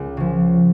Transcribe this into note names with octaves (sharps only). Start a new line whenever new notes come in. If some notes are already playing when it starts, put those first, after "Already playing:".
Already playing: C#2
C#3 F3